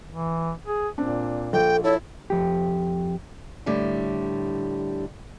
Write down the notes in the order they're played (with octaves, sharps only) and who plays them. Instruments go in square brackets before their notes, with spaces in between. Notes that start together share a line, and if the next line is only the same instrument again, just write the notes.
[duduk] E3
G#4
[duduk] A#2 [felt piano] C4 D4
[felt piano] A#1 [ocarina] A4 [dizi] G5
[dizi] E4 [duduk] A4 [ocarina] C#5
[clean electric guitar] F2 G4
[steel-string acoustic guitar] A2 D3 G3